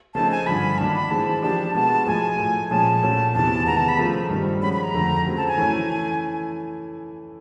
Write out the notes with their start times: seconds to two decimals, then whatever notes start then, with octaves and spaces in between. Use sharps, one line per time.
0.14 C#3 F3 A3 C4 D#4 A5
0.31 G#5
0.46 G2 D3 F3 B5
0.78 D#3 F#3 A#3 D4 A5
0.95 B5
1.11 E3 G#3 C4 A5
1.43 F3 A#3 D4 G4 A5
1.75 B2 G#3 B3 A5
2.07 A2 F3 G#3 G#5
2.39 A2 F3 A3
2.70 A#2 F3 G#3 C#4 A5
3.03 A#2 F#3 A3 C#4
3.34 E2 C3 E3 A5
3.66 D#3 G#3 B3 A#5
3.77 A5
3.88 B5
3.98 C#3 F3 A3 C4 F4
4.30 G2 D#3 G3 C4
4.62 F3 G#3 C#4 F#4 B5
4.73 B5
4.83 A#5
4.94 F2 D3 F3 A3
5.26 C#3 F#3 A3 C4
5.37 A5
5.48 G#5
5.58 E3 A3 C#4 E4